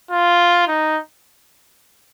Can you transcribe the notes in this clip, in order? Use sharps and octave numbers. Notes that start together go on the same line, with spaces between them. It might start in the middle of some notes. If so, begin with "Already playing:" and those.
F4
D#4